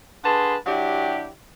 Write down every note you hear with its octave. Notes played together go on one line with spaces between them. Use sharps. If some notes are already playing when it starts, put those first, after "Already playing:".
D3 G#4 B4 A5 C6
F#3 D4 E4 G4